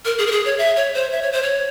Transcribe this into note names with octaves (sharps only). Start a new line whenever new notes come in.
A#4
G#4
A#4
G#4
C#5
E5
C#5
C5
E5
C#5
C5
C#5